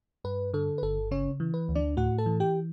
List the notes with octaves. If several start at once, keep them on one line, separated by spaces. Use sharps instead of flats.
G2 B4
D3 A4
B4
G1 A4
C#3 C#4 C#5
E3
B4
D2
D4 D5
A2 F#4 F#5
A4 A5
E3
G4 G5